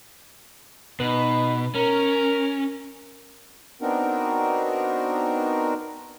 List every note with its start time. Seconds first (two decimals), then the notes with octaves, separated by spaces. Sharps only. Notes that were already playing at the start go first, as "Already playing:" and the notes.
1.00 B2 D#4 B4
1.75 C#4 A#4
3.81 B3 C4 D4 D#4 F#4 A#4